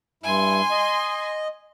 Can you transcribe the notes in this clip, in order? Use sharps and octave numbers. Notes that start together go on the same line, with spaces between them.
G2 E4 G#5 C6
D#5